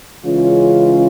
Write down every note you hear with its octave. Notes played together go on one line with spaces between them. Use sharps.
C#3 E3 G#3 C#4 F4